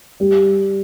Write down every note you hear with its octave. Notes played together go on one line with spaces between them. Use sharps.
G3